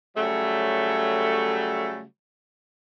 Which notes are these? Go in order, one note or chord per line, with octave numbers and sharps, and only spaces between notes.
C#3 F#3 G3 A3